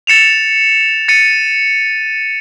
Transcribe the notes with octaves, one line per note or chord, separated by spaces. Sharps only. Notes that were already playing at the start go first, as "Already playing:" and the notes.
A6 C#7 E7 F7
A6 C#7 D#7